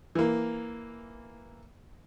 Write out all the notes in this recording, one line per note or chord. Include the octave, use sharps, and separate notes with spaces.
E3 A#3